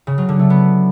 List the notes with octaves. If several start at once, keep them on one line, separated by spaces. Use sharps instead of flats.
C#3
F#3
D3
A3
B3